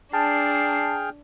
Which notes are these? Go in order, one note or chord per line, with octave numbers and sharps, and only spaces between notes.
D4 G#4 G5 A5 F6 C7